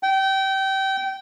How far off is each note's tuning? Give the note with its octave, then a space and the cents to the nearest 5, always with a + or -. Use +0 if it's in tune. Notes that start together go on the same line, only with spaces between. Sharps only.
G5 -25